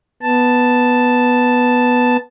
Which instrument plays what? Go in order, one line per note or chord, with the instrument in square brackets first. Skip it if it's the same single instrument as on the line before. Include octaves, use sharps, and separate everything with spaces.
[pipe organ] B3 A5